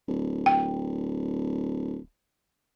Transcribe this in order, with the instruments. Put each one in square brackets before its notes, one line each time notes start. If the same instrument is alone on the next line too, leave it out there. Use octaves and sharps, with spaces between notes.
[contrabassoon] D1
[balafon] G5